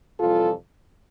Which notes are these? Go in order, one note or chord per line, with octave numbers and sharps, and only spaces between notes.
F2 C3 E3 G3 F4 A4